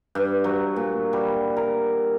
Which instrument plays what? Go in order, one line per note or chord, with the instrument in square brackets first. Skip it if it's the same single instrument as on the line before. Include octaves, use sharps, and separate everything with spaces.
[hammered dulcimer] G2
F#3
A#2
G3
A#4